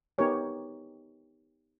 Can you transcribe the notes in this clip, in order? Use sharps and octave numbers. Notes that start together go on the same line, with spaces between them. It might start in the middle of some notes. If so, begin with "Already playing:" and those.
B3 D#4 G4 A#4 C#5 G#5